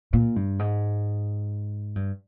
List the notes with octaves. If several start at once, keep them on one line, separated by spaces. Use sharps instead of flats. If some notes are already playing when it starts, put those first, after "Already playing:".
A#2
G2
G#2
G2